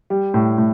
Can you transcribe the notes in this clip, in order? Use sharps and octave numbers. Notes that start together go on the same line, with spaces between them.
G3
A2
A2